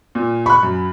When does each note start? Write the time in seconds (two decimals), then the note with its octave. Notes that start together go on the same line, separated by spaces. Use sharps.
0.15 A#2
0.46 B5 C#6 F#6
0.63 F#2